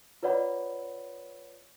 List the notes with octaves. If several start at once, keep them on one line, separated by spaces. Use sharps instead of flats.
F4 B4 C#5 D5 F#5 B5